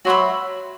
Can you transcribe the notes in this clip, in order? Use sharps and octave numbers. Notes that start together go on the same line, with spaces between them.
F#3 F#4 C5 E5 B5